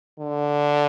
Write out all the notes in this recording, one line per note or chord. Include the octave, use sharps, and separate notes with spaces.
D3